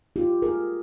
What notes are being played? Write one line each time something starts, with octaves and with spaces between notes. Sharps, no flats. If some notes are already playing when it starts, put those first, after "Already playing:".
F4 G4
G#4 A#4